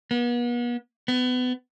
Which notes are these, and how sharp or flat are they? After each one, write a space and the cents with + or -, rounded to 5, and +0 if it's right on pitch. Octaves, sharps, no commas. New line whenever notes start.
B3 -40
B3 +25